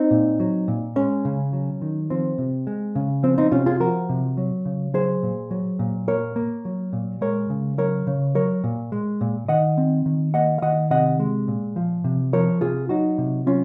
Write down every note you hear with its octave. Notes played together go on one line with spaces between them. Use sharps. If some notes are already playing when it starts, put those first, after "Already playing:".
Already playing: C4 D#4
A#2
F#3
A#2
G#3 C#4
C#3
F#3
D#3
F3 C4
C3
G#3
C#3
F3 C4
C4 D#4
C3 C#4 F4
F4 G#4
F3 F#4 A#4
C3
F#3
C#3
F#3 G#4 C5
A#2
F#3
A#2
A#3 A#4 C#5
A#3
F#3
A#2
G#3 A#4 C#5
C#3
F#3 A#4 C#5
C#3
F#3 A#4 C#5
A#2
G#3
A#2
D#3 D#5 F#5
C4
D#3
A#3 D#5 F#5
F5
D#3 D#5 F#5
C3 D#5 F#5
G#3
A#2
F3
C3
F3 A#4 C#5
C3 F4 G#4
F#3 D#4 F#4
C3
F#3 C#4 F4